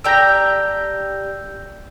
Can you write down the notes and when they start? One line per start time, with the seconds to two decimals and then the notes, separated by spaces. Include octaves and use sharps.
0.04 D4 G4 A#5 E6 G6 A#6